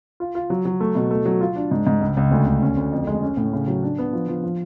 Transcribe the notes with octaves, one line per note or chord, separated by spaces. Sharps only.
F4
F4
F#3
F#3
A3
B2
A3
F#3
F4
D4
G#2
G#2
C#2
C#2
D2
D2
C#4
D2
F2
G#3
C#4
A2
C#3
F#3
D4
B3
F3
F3
F3